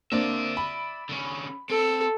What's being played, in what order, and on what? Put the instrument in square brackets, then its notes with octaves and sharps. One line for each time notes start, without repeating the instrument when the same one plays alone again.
[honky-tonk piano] A#3 C4 D4 [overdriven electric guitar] D5 E5
[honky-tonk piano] B5
[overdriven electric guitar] D3 C#4
[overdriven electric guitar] C4 [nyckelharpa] A4